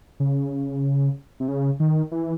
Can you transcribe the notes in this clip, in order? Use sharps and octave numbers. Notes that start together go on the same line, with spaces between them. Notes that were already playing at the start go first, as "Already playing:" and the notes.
C#3
C3
C#3
D#3
E3